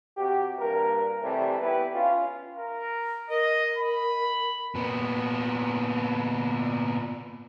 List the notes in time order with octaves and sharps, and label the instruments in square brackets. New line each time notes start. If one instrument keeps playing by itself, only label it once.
[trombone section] C3 F#4 G4
G2 A#2 A#4
C3 E3 G3 A3
B3 E4 G4 B4
C#4 F4
[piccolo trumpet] A#4
[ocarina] A#4 [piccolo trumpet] D#5
[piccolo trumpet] B5
[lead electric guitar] A#2 B3